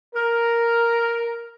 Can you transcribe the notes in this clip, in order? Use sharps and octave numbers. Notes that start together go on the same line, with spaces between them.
A#4